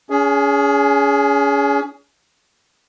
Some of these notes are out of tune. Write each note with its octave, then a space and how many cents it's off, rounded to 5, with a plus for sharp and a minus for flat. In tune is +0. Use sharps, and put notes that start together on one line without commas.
C#4 +35 G#4 +0